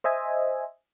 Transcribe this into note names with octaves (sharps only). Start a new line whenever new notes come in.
C5 D#5 E5 G#5